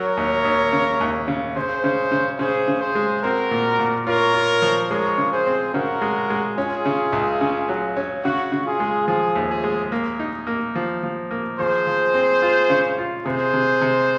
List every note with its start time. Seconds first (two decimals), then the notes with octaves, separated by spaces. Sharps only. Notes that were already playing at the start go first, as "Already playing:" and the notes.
Already playing: F#3 A#4 C#5
0.17 D#2
0.45 D#2
0.73 C#3
1.00 D#2
1.28 C#3
1.56 C#3 G#4 C5
1.84 C#3
2.12 C#3
2.39 C#3 G#4 C5
2.68 C#3
2.81 G#4 C5
2.95 G#3
3.23 C4 F#4 A#4
3.51 A#2
3.79 A#2
4.07 F4 A#4 C#5
4.34 F4
4.62 F3
4.90 G#3 A#4 C#5
5.18 C#3
5.31 G#4 C5
5.46 C4
5.74 C#3 F#4 A#4
6.02 G#3
6.30 G#3
6.57 C#4 F4 G#4
6.86 C#3
7.13 C#2
7.41 C#3
7.69 F#3
7.96 C#4
8.25 C#3 F#4
8.52 C#3
8.66 F4 G#4
8.80 G#3
9.08 F3 F4 G#4
9.36 D#2
9.49 F4 G#4
9.64 G#3
9.92 A#3
10.19 D#4
10.47 A#3
10.75 F3
11.03 F3
11.31 A#3
11.59 F3 G#4 C5
11.87 F3
12.14 C4
12.42 F4
12.70 C#3
12.98 F4
13.25 C3 G#4 C5
13.53 C3
13.81 C3